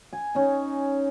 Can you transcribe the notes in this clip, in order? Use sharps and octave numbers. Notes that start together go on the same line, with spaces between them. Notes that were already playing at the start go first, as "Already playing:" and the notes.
G#5
C#4 D#4